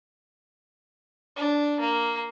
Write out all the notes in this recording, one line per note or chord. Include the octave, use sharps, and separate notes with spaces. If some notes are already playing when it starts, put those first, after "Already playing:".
D4
A#3